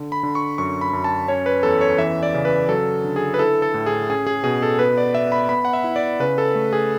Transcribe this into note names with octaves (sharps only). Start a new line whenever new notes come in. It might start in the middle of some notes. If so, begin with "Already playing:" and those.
Already playing: D3
B5
D3
C#6
F#2 C#6
B5
F#2
A5
C#4 C#5
B4
E2 A4
C#5
E3 E5
D5
C#3
B4
F#3 A4
D3
G#4
B4
E4 A4
A4
A2
G#4
C#4 G#4
G#4
B2 G#4
A4
B3 B4
D5
B3 E5
B5
B3 B5
F#5
E5
E4
D5
C#3 B4
A4
A3
G#4